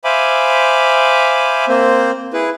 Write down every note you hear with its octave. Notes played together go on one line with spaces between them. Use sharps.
C5 E5 F5 G#5 B5 D6
A#3 C4 C5
E4 G#4 B4